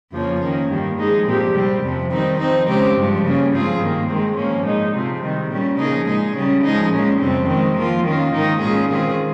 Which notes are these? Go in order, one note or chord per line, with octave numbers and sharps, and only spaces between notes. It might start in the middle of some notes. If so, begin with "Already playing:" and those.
F2 C#3 F3 A#3 C#4
D#3 A#3 C#4
G2 D#3 G3 A#3
F3 G#3 D#4 G#4
A#2 F3 C4 G4
C3 G3 C4
F2 C3 F3
D#3 G3 C4 D#4
F3 C4 D#4
C#3 G#3 C4 G4
G2 F3 G#3
C#3 G3 A#3 C#4
G#2 F3 C4 F4 G#4
G2 D#3 A#3
D#3 G#3 C4
G#2 F3 A#3 C#4
A#2 G#3 D#4
C3 F3 C4
C3 D#3 G3
A#2 G3 C#4
C#3 F3 A#3 D#4 G#4
A#2 G#3 D#4 G#4
C#3 G3 C#4
F3 G#3 D#4 G#4
A#2 G#3 C#4
F2 C3 G3 C4
D#3 G#3 C4
F3 A#3 F4
D#3 A#3 C#4 F4
G#2 D#3 A#3 D#4
A#2 G#3 C#4 F4 G#4
D#3 G#3 C4 F4 G#4